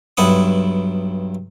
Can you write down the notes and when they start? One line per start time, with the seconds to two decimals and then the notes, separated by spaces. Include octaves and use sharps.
0.17 B1 G2 E4 F#5 D#6